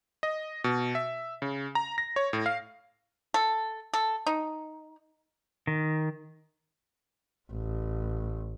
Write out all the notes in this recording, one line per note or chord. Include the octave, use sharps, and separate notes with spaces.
D#5
B2
E5
C#3
A#5
A#6
C#5
A2
F5
A4
A4
D#4
D#3
A1